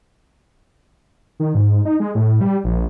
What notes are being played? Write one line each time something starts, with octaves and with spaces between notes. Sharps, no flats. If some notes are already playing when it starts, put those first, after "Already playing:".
D#3
G#2
D#4
G#3
A2
G3
A#1